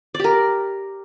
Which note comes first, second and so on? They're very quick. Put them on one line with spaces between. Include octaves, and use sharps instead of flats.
D5 G4 A#4